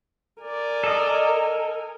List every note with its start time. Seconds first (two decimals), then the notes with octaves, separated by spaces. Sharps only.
0.41 A#4 D5 G#5
0.84 A4 D#5